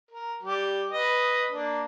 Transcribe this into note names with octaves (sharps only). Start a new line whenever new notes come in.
A#4
G3 G4
B4 D#5
A#3 D4